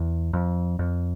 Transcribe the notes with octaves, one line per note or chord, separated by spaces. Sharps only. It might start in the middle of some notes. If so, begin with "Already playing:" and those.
Already playing: E2
F2
F2